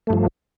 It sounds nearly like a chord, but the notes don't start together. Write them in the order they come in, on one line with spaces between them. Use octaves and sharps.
A3 G2 F3